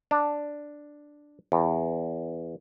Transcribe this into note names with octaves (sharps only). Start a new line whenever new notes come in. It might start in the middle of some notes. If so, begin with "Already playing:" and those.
D4
E2